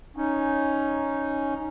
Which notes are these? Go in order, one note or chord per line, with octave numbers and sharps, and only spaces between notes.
C#4 D#4